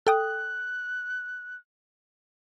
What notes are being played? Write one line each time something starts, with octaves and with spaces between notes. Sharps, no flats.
A4 G5 D#6 F#6